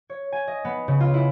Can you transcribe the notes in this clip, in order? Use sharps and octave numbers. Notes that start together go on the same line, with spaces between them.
C#5
G#5
D#5
B3
C#3
F4
E4